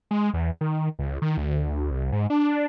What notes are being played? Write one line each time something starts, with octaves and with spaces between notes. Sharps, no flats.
G#3
E2
D#3
C#2
D#3
D2
C2
G#2
D4